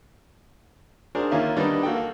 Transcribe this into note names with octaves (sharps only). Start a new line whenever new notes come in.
D4 F#4 G#4 A#4 C5
D#2 A#3 C#4 F4 E5
D#3 G3 B3 D4 D#4
A#3 F#4 A4 G5
F5